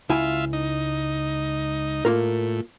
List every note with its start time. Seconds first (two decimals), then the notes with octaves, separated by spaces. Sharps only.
0.10 C#2 E4 F4 E5 G#5
0.53 D#4
2.05 A2 A#3 F4 A#4